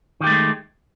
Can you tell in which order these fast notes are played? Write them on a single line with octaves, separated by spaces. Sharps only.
D#3 G4 A3 G#3